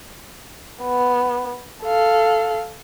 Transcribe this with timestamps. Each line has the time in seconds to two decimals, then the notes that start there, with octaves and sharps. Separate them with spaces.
0.83 B3
1.84 A4 F5